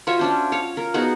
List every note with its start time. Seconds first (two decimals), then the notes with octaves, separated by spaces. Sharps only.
0.07 F4 F#4 C#5 E5
0.19 C#4 D4 C5
0.52 C#5 F5
0.77 A#4
0.94 B3 D#4 F#4 G#4